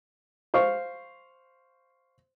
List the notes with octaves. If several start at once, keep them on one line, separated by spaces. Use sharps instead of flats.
C5 F5 C#6